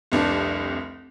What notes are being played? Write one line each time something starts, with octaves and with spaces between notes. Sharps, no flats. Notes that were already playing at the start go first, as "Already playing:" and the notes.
F1 C2 D4